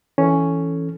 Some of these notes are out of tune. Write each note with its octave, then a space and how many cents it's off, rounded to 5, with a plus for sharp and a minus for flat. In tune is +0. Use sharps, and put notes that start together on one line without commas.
E3 +0 C#4 +0 A4 -5